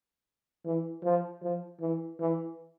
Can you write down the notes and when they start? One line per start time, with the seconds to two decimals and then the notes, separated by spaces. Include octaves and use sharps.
0.66 E3
1.04 F3
1.42 F3
1.81 E3
2.20 E3